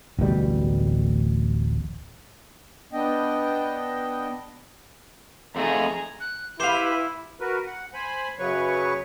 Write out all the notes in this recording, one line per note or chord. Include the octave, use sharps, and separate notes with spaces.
D1 A1 B2 G3
B3 D4 D#5 G5
F2 A3 D#4 G#4 A#5
F#6
E4 G4 B4 C5 F5
F#4 A#4 B4
F#5
C5 G#5 B5
F#2 C#3 F#3 B4 C#5 C#6